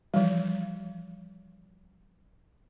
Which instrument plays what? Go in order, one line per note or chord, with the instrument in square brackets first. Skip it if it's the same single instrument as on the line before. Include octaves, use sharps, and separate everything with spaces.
[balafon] E3 F3 G3